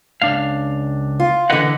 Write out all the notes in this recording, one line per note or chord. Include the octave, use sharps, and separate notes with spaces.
C#2 D4 F5
F4
D3 E3 B4 D#5 F#5